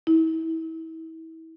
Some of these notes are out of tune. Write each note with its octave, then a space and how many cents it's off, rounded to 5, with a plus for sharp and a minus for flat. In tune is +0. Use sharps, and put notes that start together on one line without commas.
E4 -30